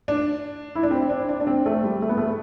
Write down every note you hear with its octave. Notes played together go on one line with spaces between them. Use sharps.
D4
E4
D4
C4
D4
D4
D4
C4
A3
G3
A3
B3
A3